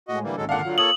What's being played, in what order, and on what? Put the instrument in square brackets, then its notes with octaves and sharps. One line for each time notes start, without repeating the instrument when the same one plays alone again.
[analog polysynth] A2 G#3 [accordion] F#4 D#5
[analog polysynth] D3 [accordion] E3 G3 A#3
[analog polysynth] G#1 C#2 D#3 [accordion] F#3 G#3 A4
[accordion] A#2 D3 D4 [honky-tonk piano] F5 F#5
[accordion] D3 F#3 [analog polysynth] F4
[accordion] A#3 A4 C#5 [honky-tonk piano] D#6 [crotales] F#7